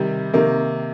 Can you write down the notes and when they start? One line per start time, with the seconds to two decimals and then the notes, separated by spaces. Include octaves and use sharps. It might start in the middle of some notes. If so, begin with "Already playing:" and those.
Already playing: C3 D#3 G3
0.33 C3 D#3 A#3